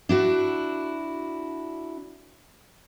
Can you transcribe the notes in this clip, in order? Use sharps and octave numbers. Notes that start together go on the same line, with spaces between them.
D4 E4 F#4